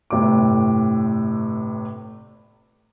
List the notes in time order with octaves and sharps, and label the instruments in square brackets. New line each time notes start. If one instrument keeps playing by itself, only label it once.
[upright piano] G1 A2 C3 A3 D6